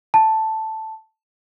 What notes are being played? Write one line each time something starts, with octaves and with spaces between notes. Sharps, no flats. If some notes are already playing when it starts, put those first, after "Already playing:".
A5